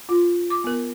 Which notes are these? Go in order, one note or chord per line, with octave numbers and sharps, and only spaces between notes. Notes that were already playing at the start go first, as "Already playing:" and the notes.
F4
D6
B3 A#4